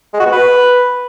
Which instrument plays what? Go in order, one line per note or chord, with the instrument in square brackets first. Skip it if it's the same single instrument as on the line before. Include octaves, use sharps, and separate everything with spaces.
[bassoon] G#3
F#4
B3
B4